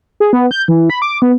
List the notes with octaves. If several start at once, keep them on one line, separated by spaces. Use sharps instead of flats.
G#4
B3
G6
E3
B5
D6
B3